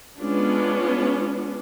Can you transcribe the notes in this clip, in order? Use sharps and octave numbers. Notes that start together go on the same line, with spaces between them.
G#3 B3 C#4 D4 F4